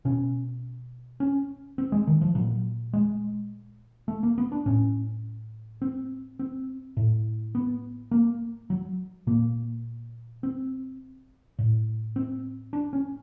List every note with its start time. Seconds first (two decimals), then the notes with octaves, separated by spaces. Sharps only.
0.05 B2 C#4
1.20 C#4
1.78 C4
1.92 G#3
2.07 D#3
2.21 F3
2.35 A#2 F#3
2.93 G#3
4.08 A3
4.23 A#3
4.38 B3
4.52 D4
4.66 A2 C#4
5.82 C4
6.39 C4
6.97 A2
7.55 B3
8.11 A#3
8.70 F#3
9.27 A#2 A#3
10.43 C4
11.59 A2
12.16 C4
12.73 D4
12.93 C#4